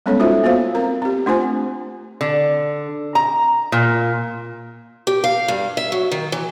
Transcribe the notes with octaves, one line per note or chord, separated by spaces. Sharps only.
G3 G#3 B3 C#4 A4 C#5
D#4 F4 F#4 C5 E5
A#3 B3 F#4 C5 F5
C4 A#4 A#5
C4 G4
A3 D4 F4 C5 G#5
D3
A#5
A#2
G4
F5
G2
E5
F#3
D#3
E3